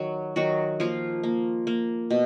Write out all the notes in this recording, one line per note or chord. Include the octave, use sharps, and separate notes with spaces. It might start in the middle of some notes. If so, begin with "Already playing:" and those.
Already playing: D#3 F#3
D#3 F#3 F#4
F3 A#3 F4
A#3
A#3
B2